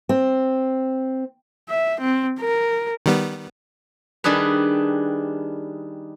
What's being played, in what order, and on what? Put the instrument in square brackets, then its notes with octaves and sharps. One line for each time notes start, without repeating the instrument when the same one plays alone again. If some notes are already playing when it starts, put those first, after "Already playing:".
[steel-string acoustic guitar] C4
[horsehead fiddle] E5
C4
A#4
[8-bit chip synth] D#3 G3 B3
[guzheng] D#3 G3 D4 G#4 B4